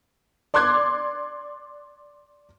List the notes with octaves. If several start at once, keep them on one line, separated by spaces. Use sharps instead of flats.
D5 C6 D6 F#6 G#6